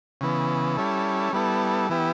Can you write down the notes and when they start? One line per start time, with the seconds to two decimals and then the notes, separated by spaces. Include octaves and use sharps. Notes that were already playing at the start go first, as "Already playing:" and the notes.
0.21 C#3 E3 B3
0.77 G3 C#4 E4 A4
1.33 G3 B3 E4 A4
1.89 E3 B3 E4 G4